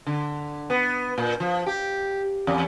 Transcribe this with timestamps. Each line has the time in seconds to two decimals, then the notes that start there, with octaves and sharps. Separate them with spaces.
0.07 D3
0.70 B3
1.18 A#2
1.40 F3
1.66 G4
2.47 E2